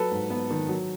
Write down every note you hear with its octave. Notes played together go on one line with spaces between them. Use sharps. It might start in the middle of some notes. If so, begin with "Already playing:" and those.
Already playing: F#3 A4 B4
G#2
B3
D#3
F#3